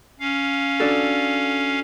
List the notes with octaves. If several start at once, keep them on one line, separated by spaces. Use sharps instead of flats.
C#4 F5
D4 F#4 A4